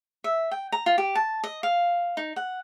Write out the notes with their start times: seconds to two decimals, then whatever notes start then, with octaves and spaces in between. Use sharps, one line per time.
0.24 E5
0.51 G5
0.72 A#5
0.86 F4
0.98 G4
1.15 A5
1.44 D#5
1.63 F5
2.17 D#4
2.36 F#5